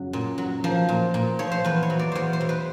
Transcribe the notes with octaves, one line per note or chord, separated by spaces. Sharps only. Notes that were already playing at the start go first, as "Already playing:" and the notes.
Already playing: F#2 C#3 F#3
A#2
F#3
F3 A#4
A#2
A#2
F3 C#5
C5
E2 B4
C#5
F#3
D5
E2 C5 C#5
C5
B2
B4